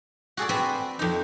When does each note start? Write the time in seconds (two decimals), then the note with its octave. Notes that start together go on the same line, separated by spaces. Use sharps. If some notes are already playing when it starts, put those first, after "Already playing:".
0.37 F#4 G#4 A4 D5
0.49 C4 F#4 B4 G#5
0.99 F2 D#4